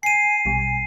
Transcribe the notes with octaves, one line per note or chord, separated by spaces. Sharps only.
G#5 C7 D#7
A#1 B2 G3 G#5